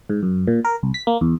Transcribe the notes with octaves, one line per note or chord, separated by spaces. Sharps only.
G#2
F#2
A#2
A#4
C2
B6
A#3
E2